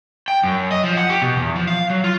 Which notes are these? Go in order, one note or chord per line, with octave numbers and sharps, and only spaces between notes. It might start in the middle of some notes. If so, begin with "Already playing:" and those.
G5
F#2
D#5
F3
F#5
G4
B2
E2
F3
F5
F#3
F4